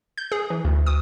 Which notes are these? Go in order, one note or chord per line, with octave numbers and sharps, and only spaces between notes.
G6
G#4
E3
D2
D#6